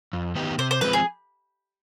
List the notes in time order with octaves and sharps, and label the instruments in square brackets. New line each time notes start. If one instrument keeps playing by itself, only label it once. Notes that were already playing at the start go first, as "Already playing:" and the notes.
[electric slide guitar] F2
D#3 B3 D#4 G4
[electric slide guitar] C3 [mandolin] C5
[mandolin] C5
[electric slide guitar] F3 G#3 C4 [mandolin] B4
[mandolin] G#4